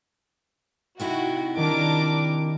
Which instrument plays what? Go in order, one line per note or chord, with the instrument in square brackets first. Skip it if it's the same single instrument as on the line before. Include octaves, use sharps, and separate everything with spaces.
[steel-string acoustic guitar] C3 D#4 E4 [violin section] F#4
[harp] D#3 [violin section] D4 A#4 D6